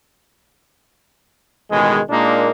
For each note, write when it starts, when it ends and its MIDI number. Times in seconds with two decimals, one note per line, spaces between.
1.71 1.99 33
1.71 1.99 47
1.71 1.99 51
1.71 1.99 56
2.10 2.50 46
2.10 2.50 56
2.10 2.50 58
2.10 2.50 62
2.10 2.50 63